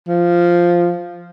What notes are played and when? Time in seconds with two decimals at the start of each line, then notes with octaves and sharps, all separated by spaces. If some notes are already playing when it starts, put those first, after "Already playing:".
0.08 F3